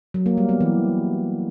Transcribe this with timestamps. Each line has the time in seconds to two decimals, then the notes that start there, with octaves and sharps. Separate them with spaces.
0.14 F#3
0.26 A#3
0.37 G3
0.49 B3
0.60 E3